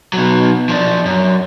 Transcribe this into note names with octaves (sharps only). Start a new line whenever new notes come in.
B2 F#3
F3 D4
F#2